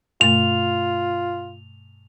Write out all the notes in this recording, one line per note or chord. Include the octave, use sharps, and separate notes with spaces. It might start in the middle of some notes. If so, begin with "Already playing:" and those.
G2 B2 A3 F4 F7